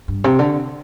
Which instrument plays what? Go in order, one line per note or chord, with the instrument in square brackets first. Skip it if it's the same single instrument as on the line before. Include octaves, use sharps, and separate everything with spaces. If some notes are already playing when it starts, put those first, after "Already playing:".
[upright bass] G2
C3
D3